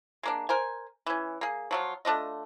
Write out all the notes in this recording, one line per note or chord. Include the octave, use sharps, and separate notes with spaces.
G#3 A#3 D4
A#4 C5 G#5
E3 C#4
A#3 G#4
F3 F#3 F4
A3 D4 F4 D#5